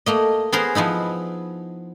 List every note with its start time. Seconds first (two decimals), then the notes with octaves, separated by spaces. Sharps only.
0.06 A3 A#3 D#5
0.52 B3 G#4 A#4 C5
0.75 F3 B3 D#4 E4